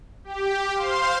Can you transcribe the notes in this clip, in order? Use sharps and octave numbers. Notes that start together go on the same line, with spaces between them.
G4
C5 F5 C6